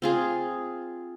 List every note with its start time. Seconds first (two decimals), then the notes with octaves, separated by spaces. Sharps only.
0.02 C4 F4 G#4